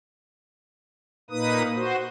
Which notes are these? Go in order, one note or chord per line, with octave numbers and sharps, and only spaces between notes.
A#2 A#3 D#4 B4 D#6
F#4 C5